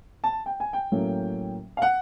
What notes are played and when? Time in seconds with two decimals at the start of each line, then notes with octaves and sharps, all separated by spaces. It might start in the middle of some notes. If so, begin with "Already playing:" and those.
0.24 A5
0.46 G5
0.60 G#5
0.73 G5
0.92 A2 F#3 A#3 C#4
1.77 F5
1.82 F#5